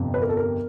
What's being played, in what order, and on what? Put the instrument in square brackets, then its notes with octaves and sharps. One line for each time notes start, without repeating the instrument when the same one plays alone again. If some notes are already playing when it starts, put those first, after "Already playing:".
Already playing: [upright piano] G1 F2 C3
B4
A#4
A4
A#4